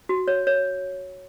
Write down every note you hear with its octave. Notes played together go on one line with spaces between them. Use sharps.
F#4
C#5
C#5